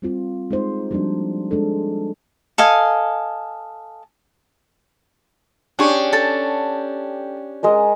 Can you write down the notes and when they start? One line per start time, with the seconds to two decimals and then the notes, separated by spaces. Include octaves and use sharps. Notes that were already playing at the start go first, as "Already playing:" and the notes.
0.02 G3 C4 F4
0.51 G#3 C4 D#4 C5
0.91 F3 G3 A#3 D4 F#4
1.51 G#3 D4 A4
2.58 A4 D#5 F5 G#5
5.79 C#4 D4 G4 G#4 C#6
6.13 A4 A5
7.63 G#3 A#4 D#5